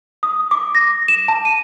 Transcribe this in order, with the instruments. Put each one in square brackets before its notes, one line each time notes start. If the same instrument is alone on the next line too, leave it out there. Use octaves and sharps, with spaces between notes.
[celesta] D#6
D6
A#6
E7
A5
D#7